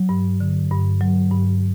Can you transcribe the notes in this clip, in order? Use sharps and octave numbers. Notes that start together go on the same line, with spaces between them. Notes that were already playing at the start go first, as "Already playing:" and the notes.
Already playing: F#3
G2
D3
G2
F#3
G2